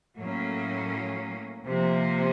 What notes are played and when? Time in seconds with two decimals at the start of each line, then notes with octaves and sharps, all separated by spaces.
0.17 A2 F#3 A#3 C#4
1.66 C3 F3 A#3